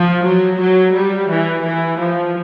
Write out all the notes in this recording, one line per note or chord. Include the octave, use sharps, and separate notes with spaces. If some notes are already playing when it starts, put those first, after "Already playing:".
Already playing: F3
F#3
F#3
G3
E3
E3
F3